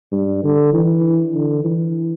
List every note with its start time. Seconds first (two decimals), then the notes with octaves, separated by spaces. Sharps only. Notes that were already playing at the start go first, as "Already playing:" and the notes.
0.12 G2
0.44 D3
0.73 E3
1.35 D3
1.64 E3